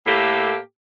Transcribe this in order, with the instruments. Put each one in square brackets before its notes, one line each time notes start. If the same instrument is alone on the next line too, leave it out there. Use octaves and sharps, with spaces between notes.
[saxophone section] A2 A3 A#3 G4 A4